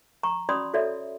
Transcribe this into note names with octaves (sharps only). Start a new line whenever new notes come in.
A#5 C#6
C#4 F#4 D5 B5 C6 D#6
F#4 A4 C#5 D5 E5